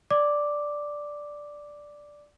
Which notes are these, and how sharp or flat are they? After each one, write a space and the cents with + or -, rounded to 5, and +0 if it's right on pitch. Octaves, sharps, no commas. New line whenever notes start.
D5 +0 D6 +0